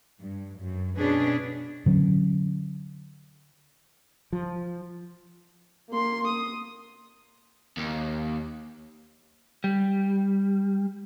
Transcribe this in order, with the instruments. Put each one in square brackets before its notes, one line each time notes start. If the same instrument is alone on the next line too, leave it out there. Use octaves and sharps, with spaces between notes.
[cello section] G2
F#2
B2 C#4 D4 G#4 B4
[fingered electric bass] D3 F#3 C#4
[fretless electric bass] F3
[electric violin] A#3 C6
D#6
[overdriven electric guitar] D#2
[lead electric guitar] G3